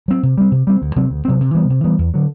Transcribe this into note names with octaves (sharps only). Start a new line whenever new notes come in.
F#3 C4
C3
G3 C4
C3
G3 C4
D2
C3 F#3 C4
D2
C3 F#3 C4
C3
E3 G3 B3
C3
E3 G3 B3
E2
D3 F#3